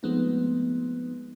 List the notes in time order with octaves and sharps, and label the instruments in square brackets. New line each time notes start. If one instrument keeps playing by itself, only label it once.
[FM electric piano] F3 G#3 A3 B3 C4 D#4